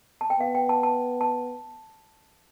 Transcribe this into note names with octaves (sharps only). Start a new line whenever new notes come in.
A5
G5
B3 F5
G5
A5
A5
A5